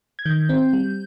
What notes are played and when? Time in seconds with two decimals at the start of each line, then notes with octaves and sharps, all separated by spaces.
0.19 G#6
0.26 D#3 G6
0.49 C4
0.73 G3